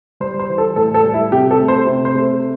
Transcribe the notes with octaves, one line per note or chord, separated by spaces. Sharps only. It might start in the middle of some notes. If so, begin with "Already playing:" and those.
G3 C5
C5
E3
A4
A2 A4
A4
G3
E4
C3 G4
A4
A3
C5
C3
C5
A3